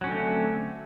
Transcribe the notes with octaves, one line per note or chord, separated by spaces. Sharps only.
D3 F#3 A3 C4 C#4